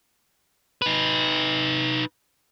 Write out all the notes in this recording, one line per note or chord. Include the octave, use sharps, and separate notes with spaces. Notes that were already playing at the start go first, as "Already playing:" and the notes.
D#4 B4